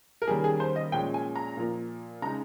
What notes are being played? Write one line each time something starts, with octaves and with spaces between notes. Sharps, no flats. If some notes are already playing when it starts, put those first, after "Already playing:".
A#4
D#3 G3 A#3 C#4 G#4
G#4
C5
D#5
A#2 F3 G#3 C#4 G5
G#5
A#5
A#2 F3 A#3
C#3 G#3 D#4 A#5